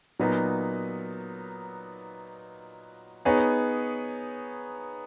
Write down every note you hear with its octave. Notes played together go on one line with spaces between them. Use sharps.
A#2 F#3 B3 D#4
B3 D#4 G#4 C#5